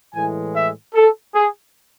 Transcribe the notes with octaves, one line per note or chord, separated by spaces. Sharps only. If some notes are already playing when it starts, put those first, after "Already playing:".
A2 E3 G#3 G#5
E5
A4
G#4